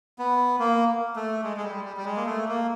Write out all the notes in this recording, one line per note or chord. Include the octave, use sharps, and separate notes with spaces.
B3
A#3
A3
G#3
G#3
G3
G3
G3
G#3
A#3
A3
A#3